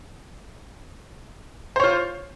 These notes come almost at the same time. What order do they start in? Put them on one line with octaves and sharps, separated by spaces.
C5 C#5 F4